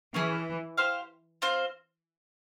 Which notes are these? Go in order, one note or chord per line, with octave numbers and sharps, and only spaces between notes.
E3 C#4 E4 G#4
G4 C5 F5
C4 F4 C5